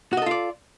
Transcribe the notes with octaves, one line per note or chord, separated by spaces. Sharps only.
F4 F#4 A4 D5 D#5